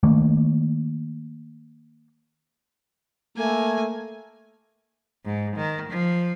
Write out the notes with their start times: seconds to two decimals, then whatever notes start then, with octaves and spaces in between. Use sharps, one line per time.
0.03 D#3 A3 A#3
3.37 A3 A#3 G#5
5.26 G#2
5.56 D#3
5.90 F3